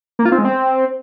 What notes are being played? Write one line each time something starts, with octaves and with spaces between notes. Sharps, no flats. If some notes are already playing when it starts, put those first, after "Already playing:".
A#3
F4
C4
G#3
C4